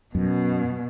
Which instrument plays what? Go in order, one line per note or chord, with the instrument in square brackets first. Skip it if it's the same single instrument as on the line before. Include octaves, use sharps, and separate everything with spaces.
[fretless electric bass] F#2 [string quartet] B2